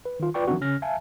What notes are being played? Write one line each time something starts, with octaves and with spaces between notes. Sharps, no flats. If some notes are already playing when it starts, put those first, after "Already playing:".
B4
D#3 F4
F4 B4 D5 G5 C#6
D#3 F3 F#3 C4 D4 F#4
C#3 C#4 F6 A#6
E5 F5 G#5 A5